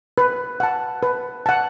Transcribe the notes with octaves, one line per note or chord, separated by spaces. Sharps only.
B4
F#5 A5
B4
F#5 A5